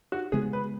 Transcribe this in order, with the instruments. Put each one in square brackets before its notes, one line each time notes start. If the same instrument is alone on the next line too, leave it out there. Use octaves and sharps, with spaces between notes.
[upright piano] F#4
[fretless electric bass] C#3 G#3 B3 [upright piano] G#4
[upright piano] B4